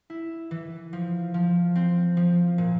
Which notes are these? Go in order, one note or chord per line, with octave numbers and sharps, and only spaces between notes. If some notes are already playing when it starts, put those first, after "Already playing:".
E4
E3
F3
F3
C4
F3
A#2